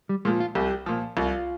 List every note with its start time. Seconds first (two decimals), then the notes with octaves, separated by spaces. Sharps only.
0.09 G3
0.25 A#2 F3 G#3
0.40 F4
0.55 C2 G4
0.86 A#2 F3
1.17 C2 F4